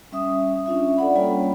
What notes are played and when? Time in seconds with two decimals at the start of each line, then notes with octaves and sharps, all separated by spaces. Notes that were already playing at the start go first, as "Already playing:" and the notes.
0.12 G3 C#4 E5 D#6
0.66 C#4 D4 F4 E5
0.97 A4 D5 F#5 B5
1.15 G3 A#3 C#4 F4 C#5 B5